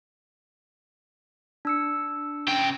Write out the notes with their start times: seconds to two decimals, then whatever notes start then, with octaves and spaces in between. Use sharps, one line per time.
1.65 D4 E6 C#7
2.48 C#3 G5